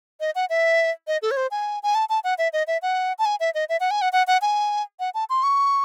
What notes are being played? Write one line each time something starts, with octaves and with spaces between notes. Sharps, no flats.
D#5
F#5
E5
D#5
A4
C#5
C5
G#5
G#5
A5
A5
F#5
E5
D#5
E5
F#5
A5
G#5
E5
D#5
E5
F#5
G#5
F#5
F#5
F#5
G#5
F#5
A5
C6
C#6